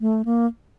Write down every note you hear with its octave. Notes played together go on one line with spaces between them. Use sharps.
A3
A#3